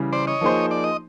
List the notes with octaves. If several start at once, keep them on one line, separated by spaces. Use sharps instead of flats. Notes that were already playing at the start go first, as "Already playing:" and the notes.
Already playing: C#3 E3 G3
C5 D5
C#5 D#5
F3 A#3 D#4 G#4 C5
D5
D#5